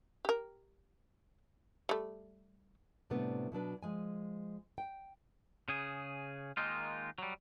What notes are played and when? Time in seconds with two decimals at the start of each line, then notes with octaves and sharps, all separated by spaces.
0.25 G4 A#4
1.89 G3 A3
3.10 A2 C3 G3 A3 B3 D4
3.52 B2 F#3 D4 B4
3.83 F3 G#3 G#5
4.78 G5
5.68 C#3 G#4
6.57 D#3 G#3 A#3 D#4 F4
7.18 F#3 G3